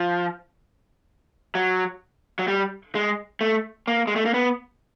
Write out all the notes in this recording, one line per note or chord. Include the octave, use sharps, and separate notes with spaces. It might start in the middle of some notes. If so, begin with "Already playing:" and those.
Already playing: F3
F#3
F#3
G3
G#3
A3
A#3
G#3
A3
A#3
B3